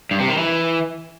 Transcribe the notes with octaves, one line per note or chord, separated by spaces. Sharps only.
G2
C3
D#3
E3